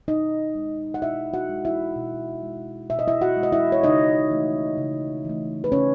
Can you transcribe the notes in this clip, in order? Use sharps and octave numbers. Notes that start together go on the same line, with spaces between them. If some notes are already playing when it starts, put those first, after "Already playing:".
B2 D#4 D#5
G#3
F#5
B2 E4 E5
F#4 F#5
G#3
E4 E5
B2
G#3
B2 E5
D#5
E4 E5
F#4 F#5
G#3
D#5
E4 E5
C#5
C#3 D#4 D#5
E3 A3
C#3
E3 A3
B4
C#3 C#4 C#5